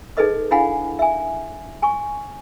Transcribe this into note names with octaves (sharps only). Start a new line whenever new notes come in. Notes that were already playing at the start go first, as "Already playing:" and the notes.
D#4 G#4 A4 B4 D#5 D#6
D4 E4 F5 F#5 G#5 B5
E5 G#5
G#5 C6 C#6